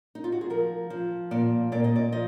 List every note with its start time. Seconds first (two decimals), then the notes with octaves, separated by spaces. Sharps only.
0.15 D#4
0.24 F4
0.32 F#4
0.41 G#4
0.50 F3 A#4
0.90 F3
1.31 A#2 D5
1.72 A#2 D5
1.84 D#5
1.96 D5
2.12 F3 D#5